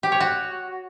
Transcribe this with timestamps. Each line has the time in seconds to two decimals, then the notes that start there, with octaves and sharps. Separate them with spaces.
0.03 G4
0.12 C#5
0.20 F#4